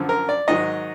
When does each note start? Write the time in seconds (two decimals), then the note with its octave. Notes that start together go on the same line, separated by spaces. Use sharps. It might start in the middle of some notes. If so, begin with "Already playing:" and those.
Already playing: F#2 D3 F3
0.09 A#4
0.29 D5
0.48 G#2 D#3 F#3 D#5